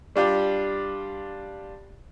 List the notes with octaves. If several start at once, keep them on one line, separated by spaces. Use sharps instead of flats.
G3 D4 F4 G4